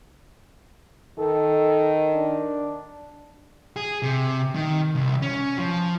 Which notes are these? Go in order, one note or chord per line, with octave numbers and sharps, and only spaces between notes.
D#3 A4
D4
G#4
C3
D#3
C2
C#4
F3